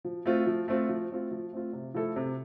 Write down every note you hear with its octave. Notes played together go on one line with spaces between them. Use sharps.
F3
A3 C4 F4
F3
A3 C4 F4
F3
A3 C4 F4
F3
A3 C4 F4
C3
F3 A3 E4 A4
C3